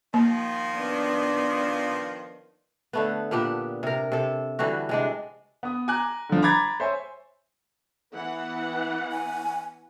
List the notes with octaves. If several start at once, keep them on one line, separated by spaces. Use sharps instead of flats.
D#3 F3 A#3
B3 D4
D3 A3 B3
A#2 B3 D4 G4
C3 A#4
C3 A4
D3 E3 G3 F#4
C3 G#3 D4
B3 D#6
G#5 A#5 D6 F#6
D3 F3
A#5 B5 D6 G#6 A6 B6
C5 C#5 E5 G#5
E3 B3 F#5
G#5